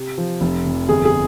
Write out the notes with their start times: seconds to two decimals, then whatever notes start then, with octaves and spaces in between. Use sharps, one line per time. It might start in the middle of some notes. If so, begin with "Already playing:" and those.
Already playing: C3
0.18 F3
0.41 F1
0.66 F2
0.89 G1 G#4
1.05 G#4